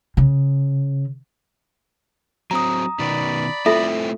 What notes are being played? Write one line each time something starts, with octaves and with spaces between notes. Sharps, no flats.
C#3
F#3 C4 A#5 D#6
B2 D#3 B3 D5 B5
A3 C4 E4 F4 A4 E5